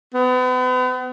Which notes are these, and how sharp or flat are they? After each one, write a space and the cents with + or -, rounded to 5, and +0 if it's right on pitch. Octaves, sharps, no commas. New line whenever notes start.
B3 +40